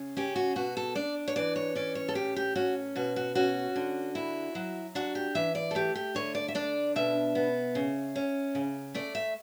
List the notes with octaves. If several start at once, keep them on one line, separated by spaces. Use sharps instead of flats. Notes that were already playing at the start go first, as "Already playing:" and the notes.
Already playing: C#3
C#4 G4
F#4
B2 F#4
A4
D4 D5
C#5
E3 D5
C#5
C#4 D5
C#5
A4
A2 G4
G4
C#4 F#4
B2 F#4
F#4
C#4 F#4
D3
E4
F#3
D4 F#4
G4
E3 E5
D5
A4
A3 G4
G4
D3 C#5
D5
E5
D4 D5
B2 E5
B3
C#3
C#4
C#3
A3 D5
E5